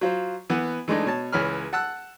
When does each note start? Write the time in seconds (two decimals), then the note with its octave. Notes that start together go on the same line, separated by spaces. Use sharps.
0.01 F#3 F4 C5
0.50 E3 B3 F#5
0.88 E3 G#3 A3 D4 D#4
1.05 B2 C#5 A5
1.32 C#2 E3 C#5 B5 F6
1.73 F#5 A5 E6 F#6